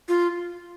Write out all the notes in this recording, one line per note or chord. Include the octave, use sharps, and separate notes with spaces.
F4